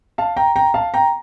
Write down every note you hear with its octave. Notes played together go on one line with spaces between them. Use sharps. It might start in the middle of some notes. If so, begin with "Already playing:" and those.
F5 A5
G5 A#5
G5 A#5
F5 A5
G5 A#5